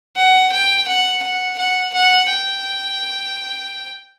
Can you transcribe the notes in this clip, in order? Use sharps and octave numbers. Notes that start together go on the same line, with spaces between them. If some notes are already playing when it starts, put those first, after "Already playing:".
F#5
G5
F#5
F#5
F#5
F#5
G5